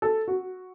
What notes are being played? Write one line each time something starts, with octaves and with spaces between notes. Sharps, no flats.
A4
F#4